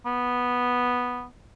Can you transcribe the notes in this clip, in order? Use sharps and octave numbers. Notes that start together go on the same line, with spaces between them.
B3